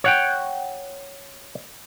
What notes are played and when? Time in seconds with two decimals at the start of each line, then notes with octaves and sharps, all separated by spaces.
0.04 C#5 F#5 G5